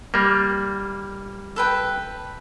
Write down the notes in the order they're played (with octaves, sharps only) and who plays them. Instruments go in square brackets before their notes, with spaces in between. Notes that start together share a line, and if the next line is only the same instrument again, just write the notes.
[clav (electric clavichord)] G3 A#3
[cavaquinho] A4 B4 G5